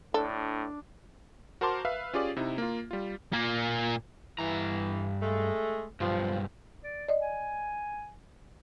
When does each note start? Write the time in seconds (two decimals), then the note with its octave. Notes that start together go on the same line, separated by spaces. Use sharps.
0.14 A2 D4 A4 D5
1.61 F#4 A#4 C5 A5 C6 D6
1.85 B4 E5 F5
2.13 C#4 F4 G4 G#4 D5
2.36 C3 D#4 E4
2.58 A#3 F4
2.91 G3 F4
3.33 A#2 A#3
4.39 G2 E3 A#5
5.22 G#3 A3
6.00 B1 G2 F3
6.84 D5
7.08 D5 D#5
7.21 G#5